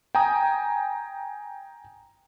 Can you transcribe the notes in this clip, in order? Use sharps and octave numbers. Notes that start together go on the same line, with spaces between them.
G5 G#5 A#5 D#6